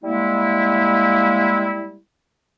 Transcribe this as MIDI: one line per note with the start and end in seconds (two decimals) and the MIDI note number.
0.04 1.97 55
0.04 1.97 56
0.04 1.97 58
0.04 1.97 64